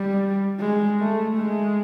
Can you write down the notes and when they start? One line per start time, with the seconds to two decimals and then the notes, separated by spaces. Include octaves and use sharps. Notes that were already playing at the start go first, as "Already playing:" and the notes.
Already playing: G3
0.59 G#3
1.00 A3
1.38 G#3